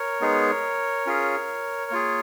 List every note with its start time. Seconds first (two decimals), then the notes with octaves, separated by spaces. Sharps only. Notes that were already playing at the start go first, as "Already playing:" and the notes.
Already playing: A#4 C#5
0.21 G#3 B3 D#4 G#4
1.06 C#4 F4 G#4
1.91 A#3 F4 G#4